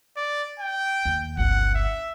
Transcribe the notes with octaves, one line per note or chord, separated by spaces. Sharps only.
D5
G5
D#2
G1 C#2 F#5
E5